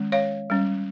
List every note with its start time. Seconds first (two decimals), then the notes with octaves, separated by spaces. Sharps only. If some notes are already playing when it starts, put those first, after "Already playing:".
Already playing: D#3 G#3 C#4
0.12 C#5 F5
0.50 G3 C#4